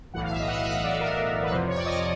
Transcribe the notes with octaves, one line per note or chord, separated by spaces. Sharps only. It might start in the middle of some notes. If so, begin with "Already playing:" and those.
B1 A2 E3 F#5
F5
E5
D#5
F#5
F5
E5
D#5
D5
A#4
B4
F2 C3 F3 C5
C#5
D5
D#5